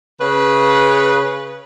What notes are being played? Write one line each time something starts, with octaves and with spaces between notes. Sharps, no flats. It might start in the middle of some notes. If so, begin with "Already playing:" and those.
C#3 B4